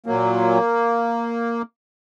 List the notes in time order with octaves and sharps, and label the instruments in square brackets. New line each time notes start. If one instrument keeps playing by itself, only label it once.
[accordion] A#2 F#3 A#3